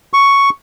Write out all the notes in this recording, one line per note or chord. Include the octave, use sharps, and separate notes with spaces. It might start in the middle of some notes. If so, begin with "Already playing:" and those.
C#6